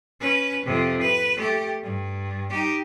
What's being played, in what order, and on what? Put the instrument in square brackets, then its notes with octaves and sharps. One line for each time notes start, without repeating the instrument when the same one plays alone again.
[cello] C#4 B4
F2 C3
B4
A3 G4
G2
D#4 G4